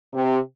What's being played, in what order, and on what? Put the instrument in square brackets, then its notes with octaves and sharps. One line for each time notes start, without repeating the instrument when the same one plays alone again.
[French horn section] C3